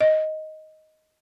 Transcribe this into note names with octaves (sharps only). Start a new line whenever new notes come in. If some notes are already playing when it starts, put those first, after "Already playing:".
D#5